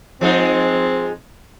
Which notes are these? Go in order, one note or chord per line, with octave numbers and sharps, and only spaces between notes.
F3 G#3 C4 D#4